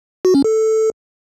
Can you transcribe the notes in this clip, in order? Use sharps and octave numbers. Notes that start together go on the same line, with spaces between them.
F#4
C#4
A4